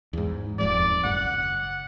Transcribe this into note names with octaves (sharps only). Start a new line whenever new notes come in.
E2 G#2
D#1 F2 G#2 D5
F#1 F#5